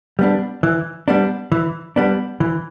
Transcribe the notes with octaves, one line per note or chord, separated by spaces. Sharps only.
G3 B3 D4
E3
G3 B3 D4
E3
G3 B3 D4
E3